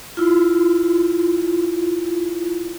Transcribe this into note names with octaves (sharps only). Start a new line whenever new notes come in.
E4 F4